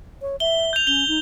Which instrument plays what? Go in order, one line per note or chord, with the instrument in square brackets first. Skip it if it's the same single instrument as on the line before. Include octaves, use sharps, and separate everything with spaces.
[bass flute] C#5
[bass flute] E5 [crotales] G7
[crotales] G6 F7
[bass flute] C#4 [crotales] G7
[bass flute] D#4